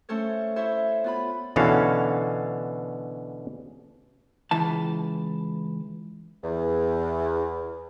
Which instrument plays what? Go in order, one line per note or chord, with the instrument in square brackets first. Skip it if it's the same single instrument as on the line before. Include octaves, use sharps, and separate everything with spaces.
[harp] A3 C#4 A4 C5 C#5
E4 C5 C#5 E5
B3 F4 B5
[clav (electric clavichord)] B2 D3 E3 C#4 A4 F5
[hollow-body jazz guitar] C#2 E3 A5
[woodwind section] E2